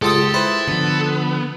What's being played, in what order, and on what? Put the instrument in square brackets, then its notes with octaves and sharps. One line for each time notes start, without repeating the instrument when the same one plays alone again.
[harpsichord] C#2 F4 D#6 [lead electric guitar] G4 [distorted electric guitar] A4
[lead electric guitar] E4 [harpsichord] B4 C5
[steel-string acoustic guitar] D3 F3 [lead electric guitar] B3